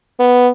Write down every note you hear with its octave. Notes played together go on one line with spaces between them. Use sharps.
B3